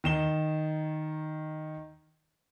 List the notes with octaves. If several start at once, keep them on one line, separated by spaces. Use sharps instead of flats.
D#3 E7 G7